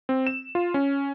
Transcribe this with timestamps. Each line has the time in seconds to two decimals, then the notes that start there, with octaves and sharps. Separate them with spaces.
0.09 C4
0.27 E7
0.55 F4
0.74 C#4